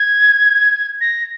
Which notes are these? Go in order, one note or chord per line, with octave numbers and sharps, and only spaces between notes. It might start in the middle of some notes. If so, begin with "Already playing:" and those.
Already playing: G#6
A#6